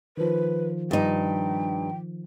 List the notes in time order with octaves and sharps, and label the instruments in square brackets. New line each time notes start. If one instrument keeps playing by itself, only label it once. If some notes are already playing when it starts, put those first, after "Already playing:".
[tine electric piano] D#3 F3 [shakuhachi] B4
[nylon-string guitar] G2 D#4 [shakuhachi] G5